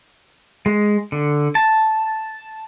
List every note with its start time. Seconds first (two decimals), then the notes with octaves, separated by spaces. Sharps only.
0.66 G#3
1.12 D3
1.55 A5